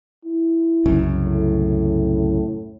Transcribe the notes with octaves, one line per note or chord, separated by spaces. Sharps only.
E4
C2 F#2 C#3
A2